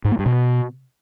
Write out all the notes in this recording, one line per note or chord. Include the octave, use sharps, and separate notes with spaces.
G#2
A#3
G2
B2